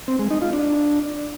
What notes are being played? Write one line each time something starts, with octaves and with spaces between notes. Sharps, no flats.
C4
G#3
D#4
F4
D4